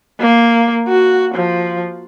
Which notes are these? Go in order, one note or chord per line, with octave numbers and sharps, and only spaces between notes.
A#3
F#4
F3